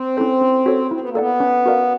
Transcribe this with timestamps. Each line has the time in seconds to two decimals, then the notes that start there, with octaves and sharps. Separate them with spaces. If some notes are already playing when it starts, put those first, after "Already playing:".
Already playing: C4
0.17 C#4 E4 A4 C5
0.41 C#4
0.66 F#4 A4 C#5
0.91 C4 E4
1.00 B3
1.09 A#3
1.15 B3 A4 D5 F#5
1.40 C#4
1.66 F#4 A#4 D5 F5